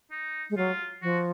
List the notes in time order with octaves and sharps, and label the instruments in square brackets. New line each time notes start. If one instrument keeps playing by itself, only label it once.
[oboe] D#4
[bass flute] G#3
[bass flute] F#3 [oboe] F4
[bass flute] F3 [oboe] F#4